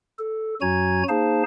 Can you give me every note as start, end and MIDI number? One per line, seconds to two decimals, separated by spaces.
0.19 0.55 69
0.61 1.03 42
0.61 1.03 54
0.61 1.03 66
0.61 1.03 80
0.61 1.03 82
0.61 1.03 92
1.09 1.43 58
1.09 1.43 63
1.09 1.43 68
1.09 1.43 72
1.09 1.43 77
1.09 1.43 81